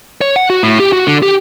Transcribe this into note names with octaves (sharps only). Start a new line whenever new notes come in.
C#5
F#5
F#4
A2
G4
F#4
D3
G4